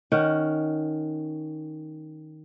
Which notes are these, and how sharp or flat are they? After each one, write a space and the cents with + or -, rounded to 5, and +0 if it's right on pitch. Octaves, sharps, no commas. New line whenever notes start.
D#3 +0 C#4 +0 F#5 +15